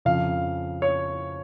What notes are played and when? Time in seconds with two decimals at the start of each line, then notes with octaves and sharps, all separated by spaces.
0.05 F2 C#3 F3 F5
0.82 C#5